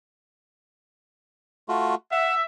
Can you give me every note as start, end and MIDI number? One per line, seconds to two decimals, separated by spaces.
1.69 1.95 57
1.69 1.95 65
1.69 1.95 66
2.12 2.43 76
2.12 2.35 78